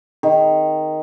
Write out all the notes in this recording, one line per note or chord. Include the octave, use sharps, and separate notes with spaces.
D#3